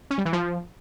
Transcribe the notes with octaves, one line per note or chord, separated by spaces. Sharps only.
C#4
G3
E3
F3